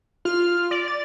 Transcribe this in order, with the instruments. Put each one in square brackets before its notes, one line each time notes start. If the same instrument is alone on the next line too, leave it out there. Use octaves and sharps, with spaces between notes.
[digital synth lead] F4 [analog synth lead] F6
[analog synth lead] D5
[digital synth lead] A6